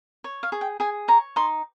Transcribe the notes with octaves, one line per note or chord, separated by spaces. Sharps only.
C#5
F5
G#4
G5
G#4 G#5
C#5 A#5
D#4 C6